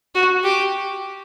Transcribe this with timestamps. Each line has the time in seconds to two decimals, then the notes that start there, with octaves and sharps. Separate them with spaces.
0.15 F#4
0.44 G4